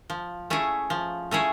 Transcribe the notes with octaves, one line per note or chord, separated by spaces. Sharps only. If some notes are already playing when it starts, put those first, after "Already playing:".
F3
A3 C#4 E4 G#4
F3
A3 C#4 E4 G#4